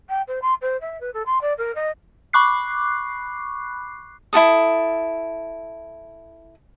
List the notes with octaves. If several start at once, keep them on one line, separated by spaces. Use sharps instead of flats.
G5
C5
C6
C5
E5
B4
A4
C6
D5
A#4
D#5
B5 C#6 D6 F#6 C7
E4 F#4 A4 D#6